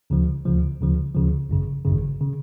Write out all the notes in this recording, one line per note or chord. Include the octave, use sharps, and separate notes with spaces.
D2 C#3 F3
D2 C#3 F3
D2 C#3 F3
D2 C#3 F3
G#1 F#2 C#3
G#1 F#2 C#3
C#3